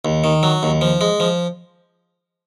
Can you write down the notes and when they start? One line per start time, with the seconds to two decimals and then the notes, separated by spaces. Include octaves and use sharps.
0.05 D#2
0.24 D#3
0.43 F#3
0.63 D#2
0.81 F3
1.01 G#3
1.20 F3